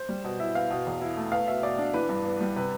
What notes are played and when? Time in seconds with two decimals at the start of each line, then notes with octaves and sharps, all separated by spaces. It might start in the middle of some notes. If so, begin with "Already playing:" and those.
Already playing: C5
0.09 G3
0.24 B2
0.40 E4 E5
0.55 B3 F5
0.70 B2
0.87 E2
1.01 E4
1.17 A3
1.32 B3 F5
1.48 B2 E5
1.63 B2 D5
1.78 D4
1.94 E3 B4
2.09 G2
2.25 B3
2.41 G3
2.56 C3 B4